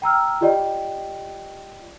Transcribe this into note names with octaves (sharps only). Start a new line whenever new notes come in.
G5 A#5 E6 F6
F4 G4 D5 D#5 G5